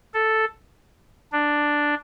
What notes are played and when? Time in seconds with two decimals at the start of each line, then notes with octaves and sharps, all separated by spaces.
0.14 A4
1.32 D4